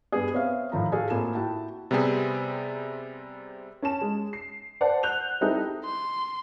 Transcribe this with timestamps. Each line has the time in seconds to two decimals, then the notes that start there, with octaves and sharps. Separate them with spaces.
0.12 G2 B3 G#4
0.33 B3 C4 C5 C#5 E5 F5
0.72 A2 D#3 F3 A#5
0.92 F#4 G#4 A4 F5 G#5
1.10 A2 A#3 C4 F4 G#5 E7
1.34 E4 F#4 G5 A5
1.91 C3 G3 B3 C4 G#4
3.82 C#4 A5 E7
4.01 G#3
4.33 C7
4.81 C5 D5 F#5 A5
5.03 F#6 G6 F7
5.41 G3 C4 D#4 E4 G#4 A4
5.85 C6